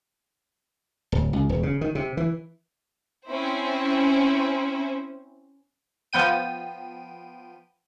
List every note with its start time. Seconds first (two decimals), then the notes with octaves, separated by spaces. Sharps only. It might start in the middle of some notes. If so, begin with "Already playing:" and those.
1.12 D1
1.33 C#2
1.49 E1
1.63 C#3
1.81 D#3
1.95 C3
2.17 E3
3.27 C4 C#4 E4 C5
6.13 F3 B3 G5 D#7